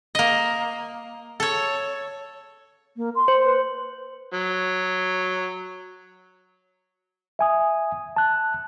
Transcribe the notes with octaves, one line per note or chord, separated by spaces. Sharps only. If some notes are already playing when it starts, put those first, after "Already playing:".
A#3 D#5
A4 C#5
A#3
C6
C5
B4
F#3
E5 G#5 D#6
A5 F#6